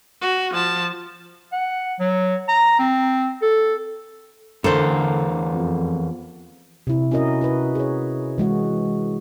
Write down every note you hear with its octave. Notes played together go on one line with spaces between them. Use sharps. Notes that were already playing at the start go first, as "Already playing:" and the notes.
F#4
F3 A5
F#5
F#3
A#5
C4
A4
E2 D3 A4 A#4 C5
F2
C3 E4
C#4 E4 F#4 A#4 D#5
E4 F#4 B4
G#4 C#5
E3 G#3 F#4